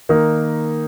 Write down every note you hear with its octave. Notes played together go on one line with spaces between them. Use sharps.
D#3 A#3 D#4